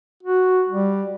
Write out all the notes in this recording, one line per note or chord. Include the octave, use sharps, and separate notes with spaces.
F#4
G3